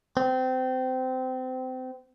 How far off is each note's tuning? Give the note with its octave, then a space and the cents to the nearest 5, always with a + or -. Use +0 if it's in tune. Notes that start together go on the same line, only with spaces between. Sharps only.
C4 -25